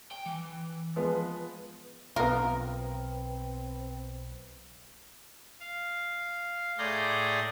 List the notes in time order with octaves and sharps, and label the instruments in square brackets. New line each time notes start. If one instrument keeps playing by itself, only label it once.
[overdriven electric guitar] G5
E3
[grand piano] F3 G#3 B3
[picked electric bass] B1 [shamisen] B3 F4 [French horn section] C4 B4 [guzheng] A#4
[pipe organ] F5
A2 G#4 D5 A#5 C6 G6